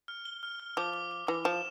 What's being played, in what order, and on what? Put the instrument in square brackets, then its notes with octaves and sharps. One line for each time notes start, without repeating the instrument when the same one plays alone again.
[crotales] F6
G7
F6
F6
[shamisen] F3 [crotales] D6
[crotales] D6
D6
[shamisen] E3 [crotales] D6
[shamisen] F3 [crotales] E7